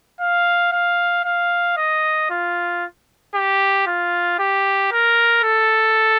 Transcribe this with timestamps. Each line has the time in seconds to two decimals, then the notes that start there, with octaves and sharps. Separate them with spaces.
0.20 F5
0.72 F5
1.24 F5
1.77 D#5
2.30 F4
3.35 G4
3.87 F4
4.39 G4
4.92 A#4
5.43 A4